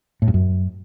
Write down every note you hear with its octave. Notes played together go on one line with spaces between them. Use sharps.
A2
G2
F#2